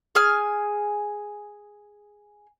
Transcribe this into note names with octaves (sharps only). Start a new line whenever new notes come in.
G#4 G#5 F6